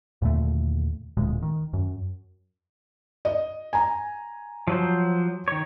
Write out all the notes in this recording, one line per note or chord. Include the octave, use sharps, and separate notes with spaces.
D#2 A#2 D3 A3
D1 D2 A#2 G#3
D#3
F#2
D#5
G#5 A#5
F3 F#3 C5
D#3 C#5